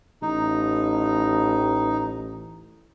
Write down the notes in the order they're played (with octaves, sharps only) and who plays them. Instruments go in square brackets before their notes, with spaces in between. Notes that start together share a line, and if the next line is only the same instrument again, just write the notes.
[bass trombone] A1 [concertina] D#4